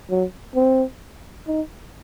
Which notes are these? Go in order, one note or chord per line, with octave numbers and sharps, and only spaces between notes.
F#3
C4
D#4